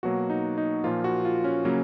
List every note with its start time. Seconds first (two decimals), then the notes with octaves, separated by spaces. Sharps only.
0.03 B2 F#3 A#3 F#4
0.30 D#4
0.58 D#4
0.84 A#2 F3 A#3 F4
1.04 F#4
1.25 F4
1.44 C#4
1.65 C#3 F#3 A#3 C#4